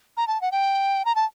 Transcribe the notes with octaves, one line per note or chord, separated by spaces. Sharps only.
A#5
A5
F#5
G5
A#5
A5